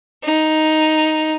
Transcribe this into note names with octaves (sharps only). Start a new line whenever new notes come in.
D#4